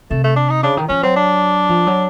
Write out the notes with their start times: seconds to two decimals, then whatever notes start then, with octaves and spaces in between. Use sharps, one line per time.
0.11 C3 A3
0.24 A3
0.36 D4
0.50 D#4
0.63 C#3 D4
0.77 D#3
0.89 F3 C#4
1.03 F#3 C4
1.16 D4
1.69 F3
1.87 F#3